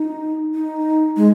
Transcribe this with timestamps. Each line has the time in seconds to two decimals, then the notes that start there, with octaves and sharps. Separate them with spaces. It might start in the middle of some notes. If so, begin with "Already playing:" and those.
Already playing: D#4
0.55 D#4
1.17 G#3